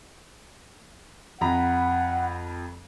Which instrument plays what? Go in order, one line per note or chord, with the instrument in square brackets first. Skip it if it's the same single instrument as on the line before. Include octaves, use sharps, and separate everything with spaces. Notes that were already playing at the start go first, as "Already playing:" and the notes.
[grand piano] F2 A#5 B5 [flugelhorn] F#5